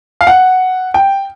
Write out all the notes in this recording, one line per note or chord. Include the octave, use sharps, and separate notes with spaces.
F5
F#5
G5